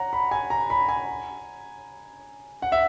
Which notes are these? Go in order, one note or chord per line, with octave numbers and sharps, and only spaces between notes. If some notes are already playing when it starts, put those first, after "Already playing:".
Already playing: C#5 F#5 A#5
B5
G#5
A#5
B5
G#5
F#5
E5